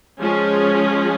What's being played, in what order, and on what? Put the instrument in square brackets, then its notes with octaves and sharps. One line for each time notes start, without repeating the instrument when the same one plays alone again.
[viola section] F3 G#3 C#4 F4 G#4